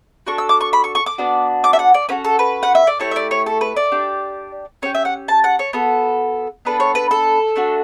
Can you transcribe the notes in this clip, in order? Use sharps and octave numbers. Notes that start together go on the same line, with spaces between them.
D4 F#4 A4 C#6
E6
D6
C#6
B5
C#6
C#6
D6
B3 D4 F#4
D6
E5
F#5
D5
C#4 F#4 A4 B4
A4
B4
F#5
E5
D5
A3 E4 G4 C#5
E5
D5
C#5
A4
B4
D5
D4 G4
C#4 G4 C#5
E5
F#5
A5
F#5
C#5
B3 F#4 A4
B3 D4 A4 B4
C#5
B4
A4
A3 D4 F#4